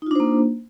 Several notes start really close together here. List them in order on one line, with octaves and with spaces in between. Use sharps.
D#4 F4 D4 C5 A#3